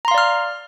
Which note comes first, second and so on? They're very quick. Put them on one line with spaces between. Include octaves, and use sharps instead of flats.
A#5 C6 F5 D5 F6